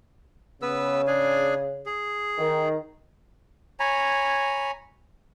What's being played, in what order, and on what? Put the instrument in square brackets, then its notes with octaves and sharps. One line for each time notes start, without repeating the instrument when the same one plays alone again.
[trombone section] C#3 [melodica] B3 B4 E6
[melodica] D4 G#4 G#5
G#4
[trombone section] D#3
[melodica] C#5 G#5 A#5 B5